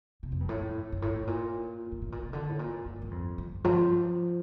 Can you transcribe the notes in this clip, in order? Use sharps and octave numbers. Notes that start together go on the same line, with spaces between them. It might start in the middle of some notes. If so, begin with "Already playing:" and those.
C3
F2
G2
A2
G2
A2
A#2
G2
A2
A#2
C3
D3
A2
A#2
G2
G2
F2
G2
F3